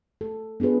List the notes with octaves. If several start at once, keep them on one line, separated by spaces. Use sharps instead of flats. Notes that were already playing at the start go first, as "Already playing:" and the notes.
A4
B3 D4 F4 G#4 B4